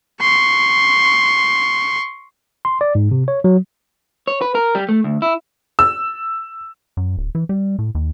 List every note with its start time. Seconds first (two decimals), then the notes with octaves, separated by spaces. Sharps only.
0.21 C6 C#6
2.65 C6
2.81 D5
2.95 G#2
3.11 C3
3.28 C#5
3.44 F#3
4.27 C#5
4.41 B4
4.55 A#4
4.75 G3
4.89 A3
5.04 D2
5.22 E4
5.79 E6
6.97 F#2
7.17 D1
7.35 E3
7.49 G3
7.79 A2
7.95 D#2